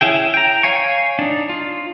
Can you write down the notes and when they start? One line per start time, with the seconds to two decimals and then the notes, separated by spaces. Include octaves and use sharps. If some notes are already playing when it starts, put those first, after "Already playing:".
0.01 C#4 E4 G#4 G5
0.34 G5 A#5
0.63 C#5 F5 G#5 C#6
1.19 D4 D#4
1.49 F4